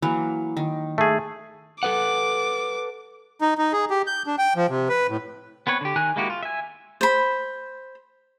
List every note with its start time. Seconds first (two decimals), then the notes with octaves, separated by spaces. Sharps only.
0.02 E3 F#3 A#3
0.57 D#3
0.98 A3 G#4
1.83 A4 B4 F#5 D6
3.41 D#4
3.58 D#4
3.73 G#4
3.90 G4
4.07 G6
4.27 D4
4.38 G5
4.56 F3
4.69 C3
4.89 B4
5.09 A2
5.67 B3 C4 B4 C#5
5.81 D3 G4
5.96 D#3 A#4 G#5 F#6
6.16 G#3 A#3 E4 F#4 G4
6.30 F4
6.43 E5 G#5
7.01 C5 B5